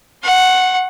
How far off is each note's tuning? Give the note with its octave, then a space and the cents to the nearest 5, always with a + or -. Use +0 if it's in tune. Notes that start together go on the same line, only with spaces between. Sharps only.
F#5 +0 C#6 -40